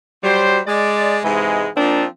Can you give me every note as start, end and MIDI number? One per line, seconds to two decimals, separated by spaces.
0.24 0.59 54
0.24 0.59 55
0.24 0.59 72
0.67 1.18 56
0.67 1.18 74
1.24 1.67 44
1.24 1.67 48
1.24 1.67 52
1.24 1.67 56
1.77 2.05 53
1.77 2.05 58
1.77 2.05 60
1.77 2.05 62
1.77 2.05 63
1.77 2.05 65